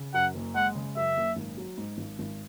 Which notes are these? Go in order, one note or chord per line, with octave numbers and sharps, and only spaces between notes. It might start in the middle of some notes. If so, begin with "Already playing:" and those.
Already playing: C#3
F#2 F#5
F#1
G#3 F#5
C#3
F#2 E5
F#1
G#1
F#3
G#2
G#1
G#1